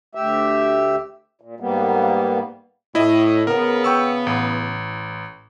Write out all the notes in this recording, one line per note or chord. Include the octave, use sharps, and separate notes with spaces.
D2 G4 E5
A#2
G#2 G3 A#3 B3
A2 E4 D#5
C#3 B3 A#4
G5 C#6 E6
A1